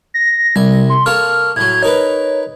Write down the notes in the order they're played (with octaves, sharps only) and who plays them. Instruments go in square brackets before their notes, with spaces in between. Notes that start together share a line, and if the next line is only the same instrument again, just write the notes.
[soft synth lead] A#6
[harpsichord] C2 G#5 [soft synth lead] G3
[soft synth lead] C6
[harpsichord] A#3 A4 C#5 [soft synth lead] F6
[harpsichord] A2 F#3 [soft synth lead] G#6
[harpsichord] D#4 A#4 B4 [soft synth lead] C#5